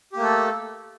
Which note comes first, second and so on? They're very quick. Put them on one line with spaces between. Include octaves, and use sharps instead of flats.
G4 A#3 A3 A4